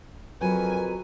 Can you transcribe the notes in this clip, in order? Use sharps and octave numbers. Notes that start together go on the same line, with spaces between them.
F2 F#3 A#4 B4 G#5